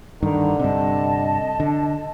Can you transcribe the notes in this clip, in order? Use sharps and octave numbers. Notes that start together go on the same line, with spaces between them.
G2 D3 D#3 A#5
G2 C3 D#5 A5
D3